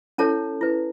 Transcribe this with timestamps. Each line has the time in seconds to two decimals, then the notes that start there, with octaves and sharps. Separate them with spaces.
0.18 C#4 E4 A4 C#5 A5
0.61 E4 B4